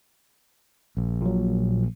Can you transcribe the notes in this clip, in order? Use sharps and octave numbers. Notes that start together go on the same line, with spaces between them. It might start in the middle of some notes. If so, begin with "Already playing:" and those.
A#1
A#2 F#3